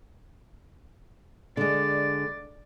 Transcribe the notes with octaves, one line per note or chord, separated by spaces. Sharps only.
D3 G#3 D5